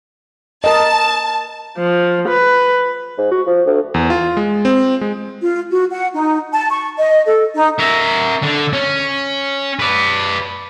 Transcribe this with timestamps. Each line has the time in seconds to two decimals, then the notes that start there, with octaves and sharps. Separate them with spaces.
0.64 A#4 D#5 A5
1.77 F3
2.28 B4
3.18 G#2
3.31 F#4
3.47 F3
3.66 D2
3.94 E2
4.10 F4
4.37 G#3
4.65 C4
5.01 G#3
5.41 F4
5.70 F#4
5.90 F#5
6.14 D#4
6.52 A5
6.70 C#6
6.98 D#5
7.25 A4
7.54 D#4
7.79 A#4 E5
8.42 D3
8.73 C#4
9.79 B4 D5